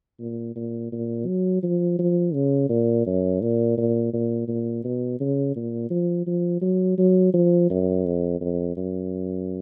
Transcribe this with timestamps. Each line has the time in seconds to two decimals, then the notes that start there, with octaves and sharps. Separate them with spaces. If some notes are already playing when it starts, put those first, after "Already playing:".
0.20 A#2
0.56 A#2
0.92 A#2
1.27 F#3
1.63 F3
1.99 F3
2.34 C#3
2.69 A#2
3.06 F#2
3.41 A#2
3.78 A#2
4.13 A#2
4.48 A#2
4.84 B2
5.20 C#3
5.56 A#2
5.90 F3
6.27 F3
6.62 F#3
6.98 F#3
7.34 F3
7.70 F#2
8.05 F2
8.41 F2
8.77 F#2